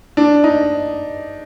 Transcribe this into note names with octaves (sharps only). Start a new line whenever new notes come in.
D4
D#4